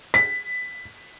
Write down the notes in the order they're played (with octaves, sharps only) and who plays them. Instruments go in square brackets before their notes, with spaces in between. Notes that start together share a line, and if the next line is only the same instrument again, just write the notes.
[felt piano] B6